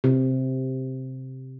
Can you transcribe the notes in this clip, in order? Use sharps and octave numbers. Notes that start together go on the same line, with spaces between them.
C3